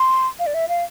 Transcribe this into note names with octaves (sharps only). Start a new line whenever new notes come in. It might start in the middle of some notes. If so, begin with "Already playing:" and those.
Already playing: C6
F5
D5
E5
F5